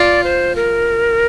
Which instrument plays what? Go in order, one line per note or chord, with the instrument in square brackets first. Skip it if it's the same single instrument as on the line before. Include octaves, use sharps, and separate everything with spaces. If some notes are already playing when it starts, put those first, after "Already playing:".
Already playing: [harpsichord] F4 [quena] D5
[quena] C5
A#4